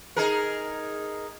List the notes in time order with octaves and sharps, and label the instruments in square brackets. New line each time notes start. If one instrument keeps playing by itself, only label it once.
[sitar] D#4 G#4 A#4